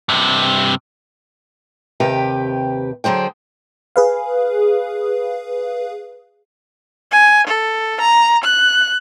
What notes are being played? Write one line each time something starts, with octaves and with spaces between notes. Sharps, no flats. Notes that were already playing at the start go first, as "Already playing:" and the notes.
G2 C3
D#2 C3 G4 B4 G5
D3 F#3 G#4 C5 G5
G#4 B4 F5
G#5
A4
A#5
F#6